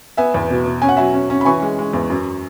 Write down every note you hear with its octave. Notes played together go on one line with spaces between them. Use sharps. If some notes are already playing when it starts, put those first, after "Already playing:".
B3 E5 G#5
E2
B2
B2
C#4 G#5
F#5
F#3 E5 G#5
C#4
C#4
B5
E3 G#5 C#6
G#3
G#3
E2
F#2